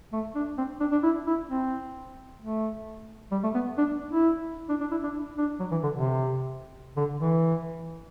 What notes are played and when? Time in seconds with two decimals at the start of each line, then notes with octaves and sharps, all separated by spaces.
0.13 A3
0.35 D4
0.58 C4
0.80 D4
0.92 D4
1.03 E4
1.27 E4
1.50 C4
2.41 A3
3.32 G3
3.43 A3
3.54 B3
3.78 D4
4.12 E4
4.69 D4
4.81 D4
4.91 E4
5.04 D4
5.38 D4
5.60 F#3
5.71 E3
5.83 D3
5.95 C3
6.97 D3
7.20 E3